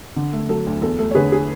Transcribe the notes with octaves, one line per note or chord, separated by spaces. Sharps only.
D3
A3
F#3 A4
D2
E2 A4
A3 A4
C#5
D3 G#4 B4
G#4